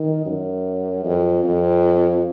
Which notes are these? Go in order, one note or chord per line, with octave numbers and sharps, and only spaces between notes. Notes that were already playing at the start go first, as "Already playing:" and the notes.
Already playing: D#3
F#2
F2
F2